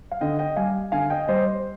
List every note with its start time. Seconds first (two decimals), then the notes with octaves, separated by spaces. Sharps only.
0.11 F5
0.21 D3 D#5 G5
0.39 D#5 G5
0.56 G3 F5 G#5
0.92 D3 F5 G#5
1.10 D#5 G5
1.28 G3 C5 D#5
1.46 C5